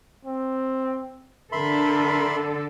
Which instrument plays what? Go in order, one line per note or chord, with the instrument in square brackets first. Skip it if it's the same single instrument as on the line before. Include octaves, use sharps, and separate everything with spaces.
[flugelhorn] C4
[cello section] D3 A4 [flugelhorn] A#4 [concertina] E5 B5 C6